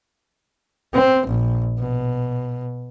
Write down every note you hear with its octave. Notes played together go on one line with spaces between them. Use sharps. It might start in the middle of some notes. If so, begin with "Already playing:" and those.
C4
A#1
B2